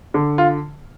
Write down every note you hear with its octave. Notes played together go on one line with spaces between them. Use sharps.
D3
F4